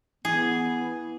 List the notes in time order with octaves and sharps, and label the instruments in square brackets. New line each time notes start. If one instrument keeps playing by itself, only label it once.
[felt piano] E3 [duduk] B3 [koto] G#4